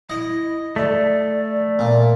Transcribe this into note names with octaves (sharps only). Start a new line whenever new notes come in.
E4 D#5
A3 D5
A#2